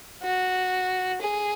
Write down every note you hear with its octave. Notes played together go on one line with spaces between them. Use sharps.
F#4
G#4